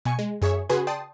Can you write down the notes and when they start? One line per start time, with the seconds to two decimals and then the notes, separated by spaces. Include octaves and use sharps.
0.05 B2 G#5 C#6 C#7
0.19 G#3
0.42 F#2 G#4 C#5 E5 C#6
0.69 C#3 F#4 G#4 B4 G#5 C6
0.87 D5 G5 A5 C6 D#6